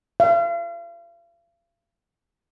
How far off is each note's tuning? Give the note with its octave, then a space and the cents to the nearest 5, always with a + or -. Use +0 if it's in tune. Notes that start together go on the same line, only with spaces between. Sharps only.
F5 -45